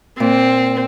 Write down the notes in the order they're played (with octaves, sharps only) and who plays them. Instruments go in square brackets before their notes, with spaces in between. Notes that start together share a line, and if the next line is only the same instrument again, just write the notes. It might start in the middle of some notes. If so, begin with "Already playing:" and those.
[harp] A#2 [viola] C4